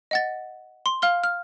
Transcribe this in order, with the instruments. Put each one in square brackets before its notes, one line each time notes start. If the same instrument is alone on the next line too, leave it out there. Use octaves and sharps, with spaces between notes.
[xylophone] D#5 F#5 A6
C6
F5 F6 G7
F6